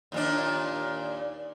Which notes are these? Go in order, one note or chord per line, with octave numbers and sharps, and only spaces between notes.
D#2 A#2 D4